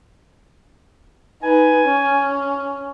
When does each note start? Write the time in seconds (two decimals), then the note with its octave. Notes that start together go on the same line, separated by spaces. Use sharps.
1.43 D#4 B4 G#5
1.84 C#4